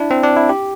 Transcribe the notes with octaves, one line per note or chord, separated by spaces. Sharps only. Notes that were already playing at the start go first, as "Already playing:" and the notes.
Already playing: D4 E4
C4
D4
E4
G4